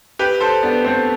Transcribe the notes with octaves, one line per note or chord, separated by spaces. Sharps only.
G4 B4
A4 C5
B3 D4
A3 C4